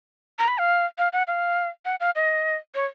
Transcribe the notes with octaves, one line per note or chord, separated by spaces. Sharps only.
A#5
B5
F5
F5
F#5
F5
F#5
F5
D#5
C#5